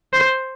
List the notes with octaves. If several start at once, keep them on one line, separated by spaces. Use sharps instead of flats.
C5